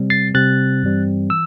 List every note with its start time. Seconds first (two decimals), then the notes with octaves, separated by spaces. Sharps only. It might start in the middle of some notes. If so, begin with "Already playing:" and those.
Already playing: C3 G3 C4
0.10 A6 C7
0.34 C3 G3 C4 F#6 A6
0.83 G2 E3 G3 C4
1.30 E3 E6